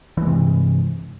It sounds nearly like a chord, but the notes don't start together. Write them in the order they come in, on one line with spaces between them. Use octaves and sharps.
E3 G#3 C3 G2